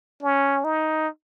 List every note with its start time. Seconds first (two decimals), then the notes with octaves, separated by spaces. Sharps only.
0.22 C#4
0.64 D#4